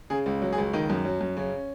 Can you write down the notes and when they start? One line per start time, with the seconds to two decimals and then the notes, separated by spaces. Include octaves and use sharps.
0.10 C#3 G#4
0.26 C#2
0.42 F#3
0.52 G#4
0.58 C#2
0.73 D#3 D#4
0.90 F#2
1.05 F#3
1.21 F#2
1.37 C#3 C#4